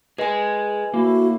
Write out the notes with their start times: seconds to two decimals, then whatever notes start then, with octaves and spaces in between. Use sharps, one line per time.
0.18 G#4 B4 D#5 G#5
0.94 A2 A#3 E4 F#4